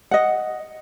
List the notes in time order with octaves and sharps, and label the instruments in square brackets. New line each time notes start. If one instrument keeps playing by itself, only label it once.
[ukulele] D#5 F#5